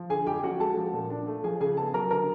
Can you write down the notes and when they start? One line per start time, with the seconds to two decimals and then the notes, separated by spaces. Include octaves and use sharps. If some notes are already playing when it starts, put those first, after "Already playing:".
Already playing: F3
0.10 D3 G#4 G#5
0.27 F2 G4 G5
0.43 C#4 F#4 F#5
0.60 G#3 A4 A5
0.77 F3
0.93 A#2
1.10 D4
1.27 A3
1.44 F3 G#4 G#5
1.61 C#3 G#4 G#5
1.77 B3 A4 A5
1.94 F#3 A#4 A#5
2.11 D3 A#4 A#5